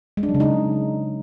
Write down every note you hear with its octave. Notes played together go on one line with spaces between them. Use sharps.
G#3
D4
F#3
C#3
D#4